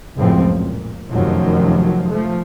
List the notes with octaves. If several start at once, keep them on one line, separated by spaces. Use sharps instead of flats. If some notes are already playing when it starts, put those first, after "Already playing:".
C#2 F#2 A2 F3 C4
A#2
F1 F#2 D#3 F3 F#3
F3 A3